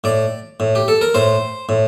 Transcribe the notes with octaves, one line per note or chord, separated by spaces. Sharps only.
A2 D5
A2
G4
A4
A#4
A2 C5
A2